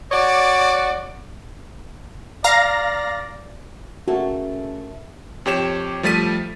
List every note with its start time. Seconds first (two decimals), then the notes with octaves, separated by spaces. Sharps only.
0.12 F#4 C#5 D5
2.44 D5 F5 A#5 A#6
4.08 C#3 A3 A#3 F#4 A4
5.46 F2 G4 C#5 E7
6.03 F3 G3 A3 A6 B6 D#7